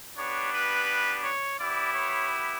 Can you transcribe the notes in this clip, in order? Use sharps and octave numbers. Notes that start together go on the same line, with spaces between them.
B3 D4 G4 C#5
B4
C#5
B3 E4 G4 D5
C#5